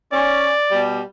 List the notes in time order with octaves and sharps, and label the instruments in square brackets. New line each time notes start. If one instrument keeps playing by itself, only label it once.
[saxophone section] C#4 [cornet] D5
[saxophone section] B2 G3